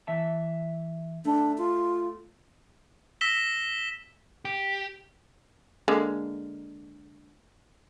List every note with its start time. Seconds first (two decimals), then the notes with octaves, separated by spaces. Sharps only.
0.07 E3 E5 A5
1.25 A3 D4
1.58 F4
3.21 E6 A#6 B6 E7 G7
4.45 G4
5.88 D3 G#3 A#3